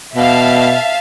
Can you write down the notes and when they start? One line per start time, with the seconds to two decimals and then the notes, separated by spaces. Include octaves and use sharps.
0.16 B2 E5 F5 A5